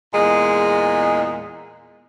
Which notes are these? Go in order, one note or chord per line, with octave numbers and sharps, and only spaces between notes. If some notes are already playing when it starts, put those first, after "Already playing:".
E2 A#2 G#3